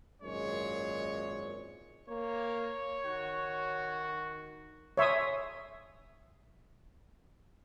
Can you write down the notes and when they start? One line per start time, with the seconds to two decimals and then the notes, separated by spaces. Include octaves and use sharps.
0.23 G#1 F#2 A#2 G#3 C#5
2.08 A#3 C#5
3.06 D#3 F#4
4.97 C#5 E5 C6 D#6